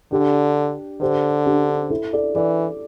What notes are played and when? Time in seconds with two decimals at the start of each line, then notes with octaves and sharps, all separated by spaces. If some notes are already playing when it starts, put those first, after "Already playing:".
0.11 D3 D4 G4
1.01 D3 G4 C5
1.46 D4 G4
1.90 E4 A4
2.13 A4 D5
2.35 E3 A4 D5